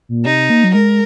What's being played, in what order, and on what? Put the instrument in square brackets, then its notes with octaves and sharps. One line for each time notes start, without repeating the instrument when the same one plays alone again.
[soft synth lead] A#2
[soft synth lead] C3 [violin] D#4
[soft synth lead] A#3
F#3
[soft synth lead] G#3 [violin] A#4